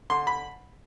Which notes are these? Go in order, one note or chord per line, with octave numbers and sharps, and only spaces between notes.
D3 C6
B5